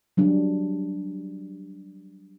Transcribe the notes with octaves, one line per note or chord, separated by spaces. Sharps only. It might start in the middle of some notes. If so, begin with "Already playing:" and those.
F#3 G3 D4